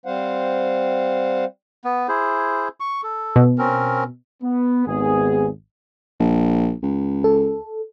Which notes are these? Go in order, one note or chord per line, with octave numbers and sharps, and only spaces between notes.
G3 C4 C5 F5 F#5
B3
E4 G#4 C5
C#6
A4
B2
C4 C#4 A#4
B3
G#1 D#2 B3 G#4
A#1
C#2
A4